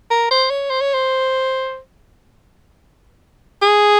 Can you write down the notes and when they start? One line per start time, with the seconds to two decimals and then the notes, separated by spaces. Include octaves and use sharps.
0.11 A#4
0.31 C5
0.50 C#5
0.70 C5
0.81 C#5
0.94 C5
3.62 G#4